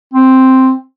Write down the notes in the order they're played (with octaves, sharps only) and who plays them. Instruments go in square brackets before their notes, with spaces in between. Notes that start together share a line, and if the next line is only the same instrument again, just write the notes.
[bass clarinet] C4